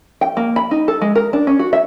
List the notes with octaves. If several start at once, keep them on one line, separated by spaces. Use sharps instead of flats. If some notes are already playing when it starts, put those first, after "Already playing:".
G5
A#3
B5
D#4
A4
G#3
A#4
D4
C#4
F#4
E5